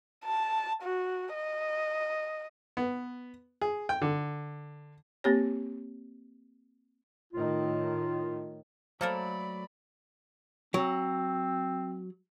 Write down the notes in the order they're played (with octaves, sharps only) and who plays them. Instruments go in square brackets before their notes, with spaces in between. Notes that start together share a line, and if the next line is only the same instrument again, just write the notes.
[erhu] A5
F#4
D#5
[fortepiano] B3
G#4
G5
D3
[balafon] A#3 C4 G4 C#5
[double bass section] A2 D#3 [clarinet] F4
[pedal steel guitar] F#3 A3 [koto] A#3 A4 A#4 [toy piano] C5 [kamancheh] D5 B5
[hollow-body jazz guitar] F#3 [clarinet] C4